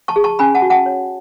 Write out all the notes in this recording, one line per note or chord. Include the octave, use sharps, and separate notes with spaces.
A5 C#6
G#4
A5 C#6
C#4 G#5 B5
F#5 A5
F#4
F#5 A5
C#5